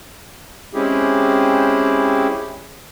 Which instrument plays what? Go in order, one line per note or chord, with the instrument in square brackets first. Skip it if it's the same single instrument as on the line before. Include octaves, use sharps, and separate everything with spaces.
[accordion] G#3 C4 C#4 E4 G4 G#4